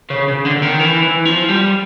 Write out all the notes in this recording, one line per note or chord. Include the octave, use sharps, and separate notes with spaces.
C#3
C#3
D3
D3
D#3
E3
E3
F3
G3